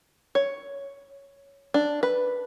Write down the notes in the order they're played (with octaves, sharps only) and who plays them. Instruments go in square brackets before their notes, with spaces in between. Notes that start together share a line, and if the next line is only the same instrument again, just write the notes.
[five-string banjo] C#5
D4
B4